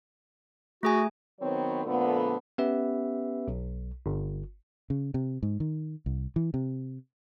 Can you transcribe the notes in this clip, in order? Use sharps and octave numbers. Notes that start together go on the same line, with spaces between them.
A3 F#4 G#4 G#5
D#3 F#3 B3 C4 B4 C#5
A#2 D3 F3 A3 B3
B3 C#4 G4 B4 E5
B1
G1
C#3
C3
G#2
D#3
C2
E3
C3